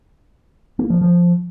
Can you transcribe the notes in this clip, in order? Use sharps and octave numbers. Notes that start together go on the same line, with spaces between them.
A#3
F3
F3